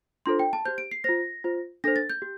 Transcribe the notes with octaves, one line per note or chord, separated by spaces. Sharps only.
D4 F4 A4 C5 C6
G5
A5
G4 C5 G6
D7
C7
F4 C5 A#6
F4 C5
D4 A4 C5 A#6
A6
G6
G4